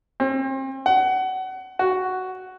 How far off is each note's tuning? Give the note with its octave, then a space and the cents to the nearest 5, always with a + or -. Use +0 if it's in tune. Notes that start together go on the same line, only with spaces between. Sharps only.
C4 +40
F#5 +25
F#4 +5